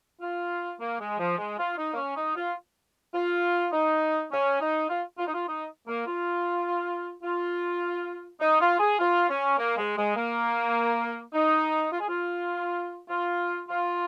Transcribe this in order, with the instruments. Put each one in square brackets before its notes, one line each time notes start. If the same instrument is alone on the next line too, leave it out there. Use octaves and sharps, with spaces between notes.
[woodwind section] F4
A#3
G#3
F3
G#3
F4
D#4
A#3
C#4
D#4
F4
F4
D#4
C#4
D#4
F4
F4
D#4
F4
D#4
A#3
F4
F4
D#4
F4
G#4
F4
C#4
A#3
G#3
G#3
A#3
D#4
F4
G#4
F4
F4
F4